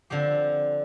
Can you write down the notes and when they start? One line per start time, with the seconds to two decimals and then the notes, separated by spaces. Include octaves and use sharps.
0.10 D3 F3 C4 G4